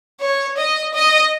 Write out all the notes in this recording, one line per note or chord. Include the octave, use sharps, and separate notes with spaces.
C#5
D#5
D#5